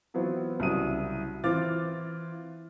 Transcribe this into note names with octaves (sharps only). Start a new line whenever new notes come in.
E3 F#3 B3 C4 F4
C2 C#3 F#3 E4 D#6 D#7
E3 C4 F4 D6 F6 A6